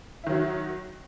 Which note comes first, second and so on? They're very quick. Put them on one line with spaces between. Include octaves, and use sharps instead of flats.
E4 D#3 F#3 F#4